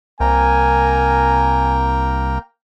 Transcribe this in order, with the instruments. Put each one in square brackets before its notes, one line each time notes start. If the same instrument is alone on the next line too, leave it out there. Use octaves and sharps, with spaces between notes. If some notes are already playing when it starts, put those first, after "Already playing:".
[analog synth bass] C2 [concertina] A#3 A#4 G5 [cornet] G#5